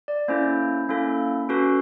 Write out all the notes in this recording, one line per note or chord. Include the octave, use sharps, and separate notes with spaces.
D5
A#3 C#4 E4 A4 C5
A#3 C#4 E4 A4
C#4 F#4 A4 B4